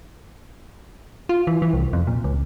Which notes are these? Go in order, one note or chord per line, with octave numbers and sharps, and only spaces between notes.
F4
E3
E3
C2
F2
A#2
C#2